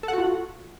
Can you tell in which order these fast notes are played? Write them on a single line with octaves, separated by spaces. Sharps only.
A4 F#5 F#4 F4